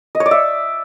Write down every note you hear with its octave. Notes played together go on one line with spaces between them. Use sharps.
D#5
C#5
D5
E5